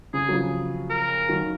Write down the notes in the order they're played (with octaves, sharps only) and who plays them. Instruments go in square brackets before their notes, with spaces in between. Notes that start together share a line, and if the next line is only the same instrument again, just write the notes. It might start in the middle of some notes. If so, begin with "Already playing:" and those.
[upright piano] C#3 [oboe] G#4
[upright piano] F#3
C#3 F3
[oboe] A#4
[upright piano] D#3 F#3